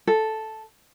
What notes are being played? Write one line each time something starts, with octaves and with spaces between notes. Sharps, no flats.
A4